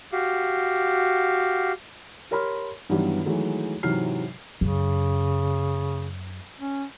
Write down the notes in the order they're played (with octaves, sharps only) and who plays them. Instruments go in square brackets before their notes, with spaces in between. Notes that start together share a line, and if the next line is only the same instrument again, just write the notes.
[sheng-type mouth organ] F#4 G4 F5
[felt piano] G4 A#4 C#5 B5 C6 F6
G2 D#3 E3 F#3 G3 B3
D#3 E3 F#3 G#3 A3
G#2 C3 E3 F#3 F6 C7
[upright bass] F#2 [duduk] C#3
[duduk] C#4